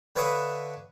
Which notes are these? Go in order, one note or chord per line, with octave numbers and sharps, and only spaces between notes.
D3 B4 C#5 E5 F5 D#6